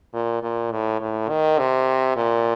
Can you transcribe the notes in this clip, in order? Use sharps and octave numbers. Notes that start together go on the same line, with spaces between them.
A#2
A#2
A2
A2
D#3
C3
A#2